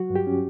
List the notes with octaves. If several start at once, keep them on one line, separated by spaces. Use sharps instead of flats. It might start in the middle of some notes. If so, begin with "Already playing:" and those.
Already playing: F#3 F#4
G2
G4
C#4